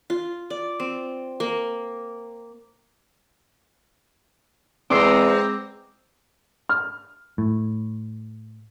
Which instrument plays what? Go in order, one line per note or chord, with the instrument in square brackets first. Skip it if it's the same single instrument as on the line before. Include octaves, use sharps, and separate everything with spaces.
[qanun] F4
D5
C4
A#3
[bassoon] E2 [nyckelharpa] G#3 A#5 [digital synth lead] C4 [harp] D6 E6 C7
[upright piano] F6
[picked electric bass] A2